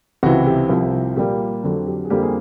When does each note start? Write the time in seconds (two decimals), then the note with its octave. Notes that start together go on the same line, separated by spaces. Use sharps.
0.23 C#2 C3 E3 F#4
0.46 G4
0.69 C2 C3 F3
1.16 A#2 G3 A#3 G4
1.64 F2 D3 F#3
1.87 G4
2.05 G#4
2.10 F2 D3 G3 A#3 G4
2.22 G#4